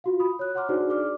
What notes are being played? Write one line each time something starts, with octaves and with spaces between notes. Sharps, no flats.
F4 F#4 F5
B5 D#6
C#5 F#6
C#5 F#5 A#5 C6 D6 F6
D4 D#4 F#4 G#4 C5 D5
G#4 D5 D6 F6